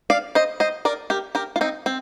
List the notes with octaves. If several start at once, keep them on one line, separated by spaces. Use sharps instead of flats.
D5 F5
C5 D#5
C5 D#5
A#4 D5
G4 A#4
G4 A#4
F4
C4 D#4
C4